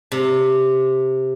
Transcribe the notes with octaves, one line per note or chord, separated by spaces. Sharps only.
C3